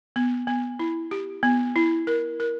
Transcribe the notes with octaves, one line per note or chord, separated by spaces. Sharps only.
B3
B3
E4
G4
B3
E4
A#4
A#4